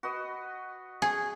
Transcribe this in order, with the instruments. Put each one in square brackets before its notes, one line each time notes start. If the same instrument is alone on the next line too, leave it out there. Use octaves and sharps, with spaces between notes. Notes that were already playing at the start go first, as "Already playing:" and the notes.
[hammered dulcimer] F#4 B4 D#5
[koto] G#4 [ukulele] G#5